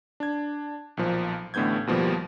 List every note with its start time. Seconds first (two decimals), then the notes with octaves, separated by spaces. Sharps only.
0.20 D4 G#6
0.97 B1 A#2 F3
1.54 A1 A2 D3 B3 G6 G#6
1.87 D#2 B2 F3 G3 A#3